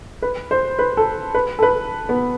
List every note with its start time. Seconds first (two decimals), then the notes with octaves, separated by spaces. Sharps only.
0.22 B4
0.51 C5
0.79 B4
0.97 A4
1.35 B4
1.59 A4
1.63 B4
2.09 B3